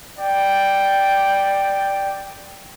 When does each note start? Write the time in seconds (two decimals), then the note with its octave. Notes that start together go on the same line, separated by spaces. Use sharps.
0.19 D5 G5